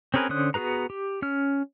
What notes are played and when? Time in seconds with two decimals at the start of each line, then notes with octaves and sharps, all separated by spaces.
0.14 C4 C#4 G#4 A#4 B4
0.29 D3 C#4 C5 D#6 F#6
0.54 B3 F#4 G#4 B4 A#5
0.90 G4
1.22 C#4 F6